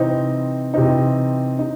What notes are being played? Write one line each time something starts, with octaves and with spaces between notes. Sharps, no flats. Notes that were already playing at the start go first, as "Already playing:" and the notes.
Already playing: C3 E3 C4 D#4
C3 E3 C4 D#4
D#4